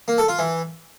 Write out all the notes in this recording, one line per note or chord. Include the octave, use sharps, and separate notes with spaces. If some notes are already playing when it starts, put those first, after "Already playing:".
A#3
A4
F4
E3